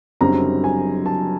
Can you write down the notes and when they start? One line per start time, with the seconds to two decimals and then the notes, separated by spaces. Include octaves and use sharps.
0.21 F#1 F#2 D3 G3 C4 A#5
0.64 G#5
1.06 A5